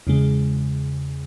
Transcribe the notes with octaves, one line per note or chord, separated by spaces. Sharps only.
E2 C#3 G#3